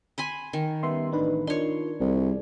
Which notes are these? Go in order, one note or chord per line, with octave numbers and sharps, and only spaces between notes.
G#5 B5 C6
D#3
G3 B3 C#4 E5 C6
A1 D4 D#4 B4
D4 D#4 F4 A#4 C#5 C6
C2 G#4 D5